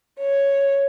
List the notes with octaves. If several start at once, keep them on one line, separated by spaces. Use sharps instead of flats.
C#5